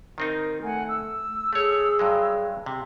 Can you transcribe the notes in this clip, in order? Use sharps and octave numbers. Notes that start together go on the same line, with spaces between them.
D#3 C4 D#4 A#4
A3 F#5 G#5
E6
A3 G#4 C#5
G2 F#3 G#3
C3